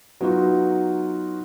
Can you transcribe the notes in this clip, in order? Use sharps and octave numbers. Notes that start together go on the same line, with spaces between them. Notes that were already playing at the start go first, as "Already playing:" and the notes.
F#3 B3 D#4 F4 F#4